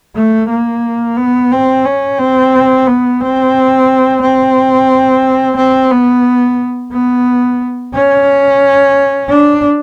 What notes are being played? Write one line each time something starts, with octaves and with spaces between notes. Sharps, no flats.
A3
A#3
B3
C4
C#4
C4
B3
C4
C4
C4
B3
B3
C#4
D4